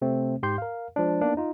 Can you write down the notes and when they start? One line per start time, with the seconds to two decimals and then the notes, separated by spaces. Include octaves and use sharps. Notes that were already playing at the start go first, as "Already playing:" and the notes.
0.02 C3 A3 C4
0.43 G#2 G4 C6 G6
0.58 A#4 F5
0.96 F3 G#3 D4
1.21 A#3 B3 D4 D#4
1.37 D#4 F4